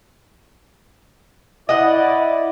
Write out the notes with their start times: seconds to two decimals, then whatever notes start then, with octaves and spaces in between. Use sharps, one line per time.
1.69 E4 D5 D#5 F#5